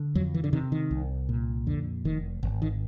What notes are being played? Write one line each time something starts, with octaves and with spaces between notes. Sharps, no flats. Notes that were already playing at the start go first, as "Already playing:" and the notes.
Already playing: D3
F2 F#3
E3
D3
C3 D#3
D#3
C2
A#2
F2 D3
F1 D#3
G#1
D#3